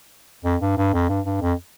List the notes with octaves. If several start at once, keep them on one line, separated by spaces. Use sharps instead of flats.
F2
G2
G2
F2
G2
G2
F2